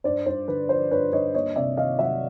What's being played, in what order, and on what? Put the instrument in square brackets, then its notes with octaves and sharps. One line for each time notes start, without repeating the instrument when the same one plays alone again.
[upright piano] G2 C5 D5
G2 C5
D3 B4
F3 C5
G2 B4 C#5
G2 C#5 D#5
A#3 C#5 D#5
C3 D5 E5
D#3 D#5 F5
F#3 E5 F#5